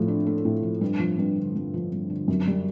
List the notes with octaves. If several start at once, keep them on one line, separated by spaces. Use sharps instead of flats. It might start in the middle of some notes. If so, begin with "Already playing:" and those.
Already playing: A2 F3 A3
D4
A3
A2
F3
G2
F3
G2
D3
G2
F3
G2
D3
F#2
G3